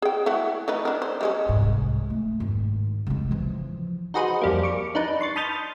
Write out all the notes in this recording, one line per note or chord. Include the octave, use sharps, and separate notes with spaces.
G#4 G5
E3 A3 F#4
A3 D#4 B4
D4 A#4
C5
G3 G#3 C#4
C2 G#2
A3
G#2 D#3
C#3 G#3
E3 F3
D#4 F#4 G#4 B4 C5
F2 G3 A#3
C#6 D6
D4 D#4 B4
C6 C#6 A6
A5 B5 D#6 F6 G6 A6